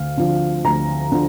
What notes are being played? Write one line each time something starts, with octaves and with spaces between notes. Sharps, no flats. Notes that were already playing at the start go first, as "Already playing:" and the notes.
Already playing: D2 F5
D3 F3
D2 A#5
D3 F3